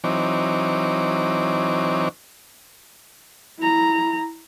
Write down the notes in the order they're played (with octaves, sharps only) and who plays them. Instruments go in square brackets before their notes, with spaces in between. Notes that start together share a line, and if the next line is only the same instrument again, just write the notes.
[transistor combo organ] E3 F#3 C4 D#4 C#5 D6
[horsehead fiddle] E4 A#5